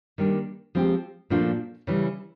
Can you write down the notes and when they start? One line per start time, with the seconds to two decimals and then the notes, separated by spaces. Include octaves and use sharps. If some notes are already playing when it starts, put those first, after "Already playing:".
0.18 D#3 G3 A#3 D4
0.75 F3 G#3 C4 E4 G4
1.30 A#2 F3 A3 D4 F4
1.87 C#3 E3 G3